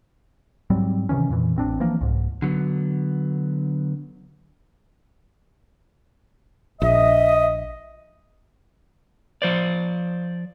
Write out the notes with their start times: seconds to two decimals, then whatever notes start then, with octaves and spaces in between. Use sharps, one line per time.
0.70 G#2 F#3 G3 C4
1.09 C3 D#3 E3 C#4
1.30 F2 A#2 E3
1.56 A1 C4 D4
1.80 E3 F3 A#3
2.01 C2 G#2
2.42 D3 F#3 B3
6.82 A#1 D#5 E5
9.42 F3 C5 D5